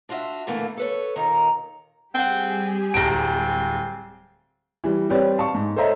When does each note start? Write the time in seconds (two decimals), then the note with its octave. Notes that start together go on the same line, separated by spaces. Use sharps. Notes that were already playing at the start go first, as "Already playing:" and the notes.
0.09 D4 F4 F#4 B4 E5
0.47 A#2 D3 E3 A3 A#3
0.77 A4 B4 C#5
1.16 D#2 A#2 D#3 A#4 A#5
2.15 G3 C4 G4 G#4 F#5 G5
2.94 D1 C4 A5 A#5 D7
4.84 E3 G3
5.09 G3 C4 G4 B4 C#5 D5
5.37 F5 A5 C#6
5.54 G#2
5.76 A4 C5 C#5 D#5 E5 A#5